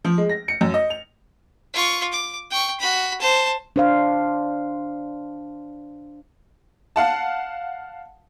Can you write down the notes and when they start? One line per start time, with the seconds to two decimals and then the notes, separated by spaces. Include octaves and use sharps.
0.05 F3
0.18 G#3
0.29 A#6
0.48 C#7
0.61 F#2
0.74 D#5
0.90 F7
1.74 F4 C#6
2.13 D6
2.51 G5 C#6
2.80 F#4 B5
3.21 C5 A5
3.76 D4 C5 F5
6.96 F5 F#5 A5